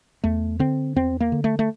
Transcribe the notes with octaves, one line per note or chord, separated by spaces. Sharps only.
E2 A3
D3 C4
E2 C4
A#3
D3
A3
A3